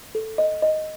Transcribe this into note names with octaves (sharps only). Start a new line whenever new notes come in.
A4
D#5
D#5